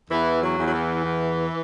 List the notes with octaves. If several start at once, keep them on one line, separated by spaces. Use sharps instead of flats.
E2 E3
F#3
E2
F#3
E3
E2